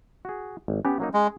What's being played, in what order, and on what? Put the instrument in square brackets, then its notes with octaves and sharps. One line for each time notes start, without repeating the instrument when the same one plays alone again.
[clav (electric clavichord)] F#4 G#4
G#1
[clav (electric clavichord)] B3 G4 [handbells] C#4
[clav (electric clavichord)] F#3 A#3 D#4
[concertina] G#3 [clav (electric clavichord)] G#4